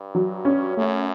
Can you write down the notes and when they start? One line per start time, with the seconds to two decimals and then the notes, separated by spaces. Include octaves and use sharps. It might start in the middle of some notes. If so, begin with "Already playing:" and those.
Already playing: G2
0.15 F#3
0.45 C#4
0.76 F#2 A3